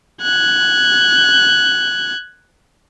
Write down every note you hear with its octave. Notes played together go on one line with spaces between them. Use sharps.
F#6 G#6